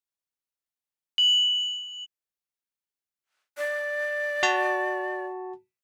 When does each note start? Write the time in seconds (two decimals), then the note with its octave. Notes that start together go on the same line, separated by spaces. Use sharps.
1.18 F#7
3.57 D5
4.43 F#4 A5